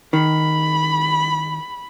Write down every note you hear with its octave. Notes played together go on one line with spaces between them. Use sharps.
D#3 B5